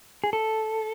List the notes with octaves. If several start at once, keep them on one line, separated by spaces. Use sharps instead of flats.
G#4
A4